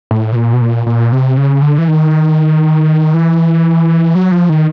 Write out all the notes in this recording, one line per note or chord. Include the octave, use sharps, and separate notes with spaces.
A2
B2
A#2
B2
A#2
A#2
C3
C#3
D3
E3
D#3
E3
F#3
F3
D#3